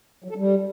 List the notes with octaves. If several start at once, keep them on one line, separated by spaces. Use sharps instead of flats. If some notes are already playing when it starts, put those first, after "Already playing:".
F#3
A4
G3